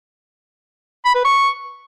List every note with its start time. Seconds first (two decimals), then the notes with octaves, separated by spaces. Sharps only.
1.05 B5
1.15 B4
1.25 C#6